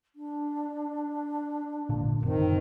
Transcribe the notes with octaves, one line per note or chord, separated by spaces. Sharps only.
D4
G#1 A#2 D3
F#1 D#3 C4